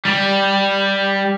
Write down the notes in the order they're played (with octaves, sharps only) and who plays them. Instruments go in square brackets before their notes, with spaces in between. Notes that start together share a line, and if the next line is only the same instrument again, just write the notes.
[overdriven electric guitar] G3